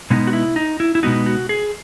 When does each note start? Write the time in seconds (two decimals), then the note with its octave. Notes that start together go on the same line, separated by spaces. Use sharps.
0.10 B2 G#3 B3 D#4
0.27 F#4
0.33 E4
0.56 D#4
0.80 E4
0.95 E4
1.03 B2 G#3 B3 D#4 F#4
1.26 F#4
1.49 G#4